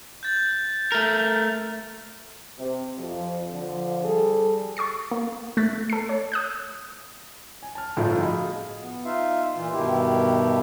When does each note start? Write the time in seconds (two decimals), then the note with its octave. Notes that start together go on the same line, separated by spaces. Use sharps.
0.23 G6 A6
0.92 A3 A#4
2.59 C3
2.99 F2 F3
3.52 D3 F3
4.04 G3 G#4 A4
4.77 C#6 D6 A6 C7
5.11 A#3
5.57 A3 F#6 A6 B6
5.90 A4 C7
6.09 C#5
6.32 D#6 F#6 G6
7.63 G#5
7.75 A5 F6
7.97 G1 A2 F3 D#4 F4
8.20 F#4 G#4 D#5 F5 B5
8.81 B3
9.05 D#4 F4 E5 F5
9.55 A#2 E3 F4
9.73 G2 B2 D#3 E4 G4